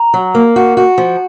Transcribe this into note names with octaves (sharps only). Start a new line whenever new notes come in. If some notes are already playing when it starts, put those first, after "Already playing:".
Already playing: A#5
F#3
A#3
F#4
F#4
F3